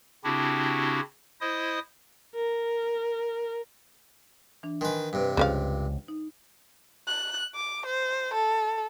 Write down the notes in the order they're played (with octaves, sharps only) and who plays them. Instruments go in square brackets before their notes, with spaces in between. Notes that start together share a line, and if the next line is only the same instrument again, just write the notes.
[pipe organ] C#3 C4 D4 E4 F#4 G4
E4 C5 D#5 D#6
[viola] A#4
[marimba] E3 D4
[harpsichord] D#3 B4 [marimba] D#5 G#5 C6
[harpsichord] G2 C3 [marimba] B4
[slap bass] C#2 [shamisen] C#3 F3 F5 [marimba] F#6
[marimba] D#4
[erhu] F#6
D6
C5
A4